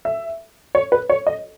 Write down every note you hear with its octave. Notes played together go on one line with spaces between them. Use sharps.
E5
C#5
B4
C#5
D#5